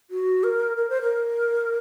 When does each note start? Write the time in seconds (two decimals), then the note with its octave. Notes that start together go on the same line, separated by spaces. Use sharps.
0.10 F#4
0.44 A#4
0.77 A#4
0.90 C5
1.02 A#4